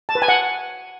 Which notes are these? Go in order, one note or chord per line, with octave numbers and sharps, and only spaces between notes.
A5
B4
G#5
F#5